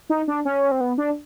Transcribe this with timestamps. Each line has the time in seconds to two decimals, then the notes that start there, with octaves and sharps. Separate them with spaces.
0.10 D#4
0.28 D4
0.45 C#4
0.71 C4
0.81 B3
0.98 D4